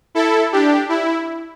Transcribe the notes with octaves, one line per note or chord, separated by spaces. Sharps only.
E4 A4
D4 G4
E4